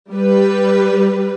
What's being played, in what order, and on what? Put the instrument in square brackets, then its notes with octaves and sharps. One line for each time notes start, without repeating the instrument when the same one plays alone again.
[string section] G3 B4